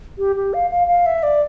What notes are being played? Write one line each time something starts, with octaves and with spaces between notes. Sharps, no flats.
G4
G4
F5
F5
F5
E5
D5